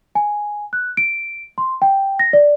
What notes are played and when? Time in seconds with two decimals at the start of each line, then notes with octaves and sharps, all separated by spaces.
0.15 G#5
0.73 F#6
0.97 D7
1.58 C6
1.82 G5
2.19 A#6
2.33 D5